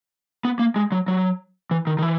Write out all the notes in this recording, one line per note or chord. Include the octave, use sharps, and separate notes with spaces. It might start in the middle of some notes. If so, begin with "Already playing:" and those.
B3
A#3
G#3
F#3
F#3
E3
D#3
D#3
E3